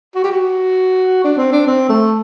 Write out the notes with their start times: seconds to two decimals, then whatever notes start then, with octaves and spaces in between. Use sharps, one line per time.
0.15 F#4
0.24 G4
0.32 F#4
1.24 D4
1.37 C4
1.52 D4
1.67 C4
1.89 A3